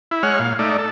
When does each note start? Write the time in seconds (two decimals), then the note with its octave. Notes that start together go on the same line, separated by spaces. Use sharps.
0.11 E4
0.23 G#3 C#5 F#5 F6
0.39 A#2 F5
0.59 A3 D#4 D5
0.78 A4